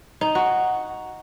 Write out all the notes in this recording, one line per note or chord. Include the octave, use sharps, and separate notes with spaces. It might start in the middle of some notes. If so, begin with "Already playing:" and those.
D#4
F#4